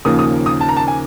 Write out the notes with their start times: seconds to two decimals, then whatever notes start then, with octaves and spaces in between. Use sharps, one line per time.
0.05 D#2 C#3 F3 A#3 D#6
0.19 D#6
0.46 D#6
0.61 A5
0.69 A#5
0.77 A5
0.88 G#5